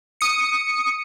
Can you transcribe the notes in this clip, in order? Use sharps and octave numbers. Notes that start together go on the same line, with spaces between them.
D#6 C#7